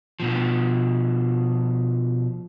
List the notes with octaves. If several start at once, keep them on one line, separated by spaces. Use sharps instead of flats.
B2 F3